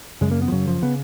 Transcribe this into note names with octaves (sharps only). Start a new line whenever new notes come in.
F#2 C#3 G#3
A#3
B3
F3
F#2 C#3 F#3
F3
C#3 B3